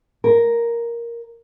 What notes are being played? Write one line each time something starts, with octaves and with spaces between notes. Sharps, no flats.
A#4